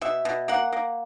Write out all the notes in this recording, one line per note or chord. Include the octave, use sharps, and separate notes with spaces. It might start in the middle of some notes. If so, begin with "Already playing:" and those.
B2 E5
B2
A#3 F#5
A#3